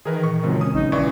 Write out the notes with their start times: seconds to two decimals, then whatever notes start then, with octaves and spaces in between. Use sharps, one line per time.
0.05 D#3 E3 G#4 A#4 B4
0.23 A#2 C#6
0.43 F#2 C#3 F3 F#3 G#3 C4
0.61 C#4 D#6
0.74 A#1 C#4 D#4
0.92 G1 E3 D5 C#6